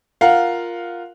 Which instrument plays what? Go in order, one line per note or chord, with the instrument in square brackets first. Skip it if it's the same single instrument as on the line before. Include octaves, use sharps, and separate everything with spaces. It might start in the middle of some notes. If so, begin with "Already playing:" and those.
[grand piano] F4 A#4 F5 F#5